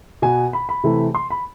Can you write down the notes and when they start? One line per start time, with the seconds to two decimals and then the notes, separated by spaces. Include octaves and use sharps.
0.22 B2 B3 G#5
0.53 B5
0.69 B5
0.84 C3 E3 A3
1.15 C6
1.30 B5